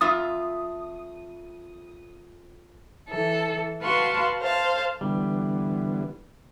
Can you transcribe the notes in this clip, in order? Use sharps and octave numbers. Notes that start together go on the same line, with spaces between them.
F2 F4 E5 D#6
E3 A4
F#4 B4 F5 A5 C6 C#6
C5 F5 A5
D3 E3 G3 B3